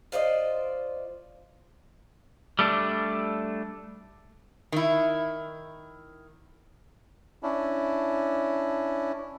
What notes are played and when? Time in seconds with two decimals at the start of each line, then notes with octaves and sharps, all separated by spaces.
0.12 F4 C5 D5 D#5
2.59 G3 A3 D4
4.72 D#3 E4
7.43 C#4 D4 E4